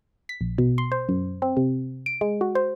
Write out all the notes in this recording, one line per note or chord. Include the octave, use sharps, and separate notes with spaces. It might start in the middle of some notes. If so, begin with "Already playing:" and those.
B6
A#1
B2
C6
C5
F#2
C4
C3
D7
G#3
F#4
C5